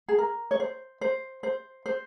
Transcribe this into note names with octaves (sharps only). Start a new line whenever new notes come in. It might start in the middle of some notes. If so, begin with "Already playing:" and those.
G#4
A#4
C#5
C5
C5
C5
C5